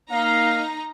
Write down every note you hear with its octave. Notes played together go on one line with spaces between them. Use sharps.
A#3 D#4 F5 A#5